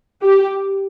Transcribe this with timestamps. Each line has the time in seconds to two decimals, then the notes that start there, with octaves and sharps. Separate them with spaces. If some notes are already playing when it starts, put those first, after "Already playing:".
0.22 G4